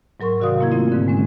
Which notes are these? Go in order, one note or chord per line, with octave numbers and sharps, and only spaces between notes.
G#2 F#3 A#4 C6 C#6
C3 D#3 F#4 D5 F5 D#6
A#3 E4 G#6
A3 C4 F4
G#2 D3
G#3 C#4